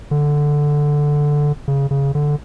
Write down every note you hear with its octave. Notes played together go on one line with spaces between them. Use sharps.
D3
C#3
C#3
D3